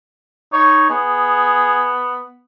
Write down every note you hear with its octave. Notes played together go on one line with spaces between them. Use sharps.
D#4 C#5
B3 G#4